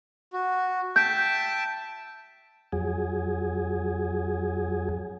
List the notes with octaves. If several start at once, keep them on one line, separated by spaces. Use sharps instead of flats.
F#4
E5 G5 A5 G6
F2 F#3 G#4